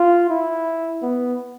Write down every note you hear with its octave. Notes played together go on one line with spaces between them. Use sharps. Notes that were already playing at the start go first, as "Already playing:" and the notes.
Already playing: F4
E4
B3